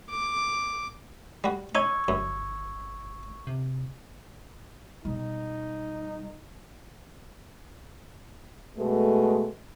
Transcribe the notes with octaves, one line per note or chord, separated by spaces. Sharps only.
D6
G3 F#4
C#4 D#4 C#6 E6 G#6
G1 F#2
C3
B2 G3 D#4
B2 G#3 A3